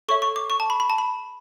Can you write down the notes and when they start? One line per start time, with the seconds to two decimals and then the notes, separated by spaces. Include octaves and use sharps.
0.08 A4 C#5 E5 C#6
0.22 C#6
0.36 D6
0.50 C#6
0.60 A5
0.70 B5
0.80 B5
0.90 A5
0.98 B5